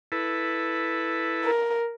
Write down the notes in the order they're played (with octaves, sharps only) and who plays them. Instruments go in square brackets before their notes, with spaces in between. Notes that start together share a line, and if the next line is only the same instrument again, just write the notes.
[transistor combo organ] E4 A4 B4
[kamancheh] A#4